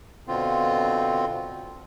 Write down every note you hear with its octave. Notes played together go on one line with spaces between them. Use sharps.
B2 D3 C4 F4